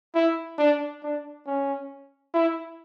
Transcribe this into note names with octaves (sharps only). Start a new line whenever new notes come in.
E4
D4
D4
C#4
E4